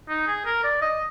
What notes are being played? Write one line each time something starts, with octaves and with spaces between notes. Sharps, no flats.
D#4
G#4
A#4
D5
D#5